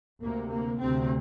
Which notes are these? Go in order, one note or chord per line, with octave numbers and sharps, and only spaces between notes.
D2 C3 A#3
A#3
D2 C3 C4